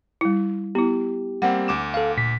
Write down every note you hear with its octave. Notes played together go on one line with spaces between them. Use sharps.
G3 E4
B3 E4 G4
G3 A#3 C4 F#5
D2 D6 E7
A4 F5
A#2 B6